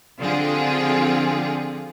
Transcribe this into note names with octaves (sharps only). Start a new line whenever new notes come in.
D3 F3 C4 F4 G4 G#4